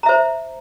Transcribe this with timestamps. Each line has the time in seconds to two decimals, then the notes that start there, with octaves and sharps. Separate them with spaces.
0.03 A#5
0.06 E5
0.09 C5